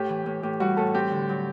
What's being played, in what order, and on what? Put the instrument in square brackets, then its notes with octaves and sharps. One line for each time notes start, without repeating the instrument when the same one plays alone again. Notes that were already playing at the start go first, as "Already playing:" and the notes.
Already playing: [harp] A2 [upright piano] G4
[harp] E3
A2
[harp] A2 [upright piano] G4
[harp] G3 [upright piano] F#4
[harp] A2 [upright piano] A4
[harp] C4 [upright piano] G4
[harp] D3
F#3